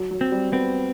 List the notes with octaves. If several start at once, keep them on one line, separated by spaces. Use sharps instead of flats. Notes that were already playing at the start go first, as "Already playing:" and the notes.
Already playing: F#3
F#3
C4
G3
B3 C4